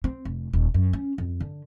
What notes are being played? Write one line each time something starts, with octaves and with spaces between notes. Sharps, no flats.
C4
F1
D#1
F#2
C#4
F2
D3